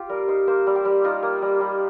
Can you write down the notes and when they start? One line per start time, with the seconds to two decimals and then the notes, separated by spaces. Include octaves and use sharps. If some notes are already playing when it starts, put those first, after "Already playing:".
Already playing: F4 G4
0.09 G3 A#4
0.28 D#4 C5
0.47 A#3 C5
0.67 G3
0.76 G4
0.85 G3
1.04 D#4 F4
1.23 A#3
1.42 G3
1.61 G3